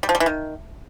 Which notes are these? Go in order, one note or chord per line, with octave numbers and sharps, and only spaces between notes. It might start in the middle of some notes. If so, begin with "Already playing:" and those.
G3
F3
G3
E3
D#3